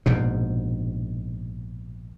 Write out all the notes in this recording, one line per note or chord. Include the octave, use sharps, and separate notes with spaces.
A#1 G#2 B2